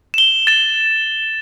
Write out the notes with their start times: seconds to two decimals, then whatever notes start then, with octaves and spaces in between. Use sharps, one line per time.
0.14 E7 G7
0.47 A6 E7